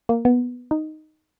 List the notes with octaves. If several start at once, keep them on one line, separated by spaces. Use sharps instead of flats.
A#3
B3
D#4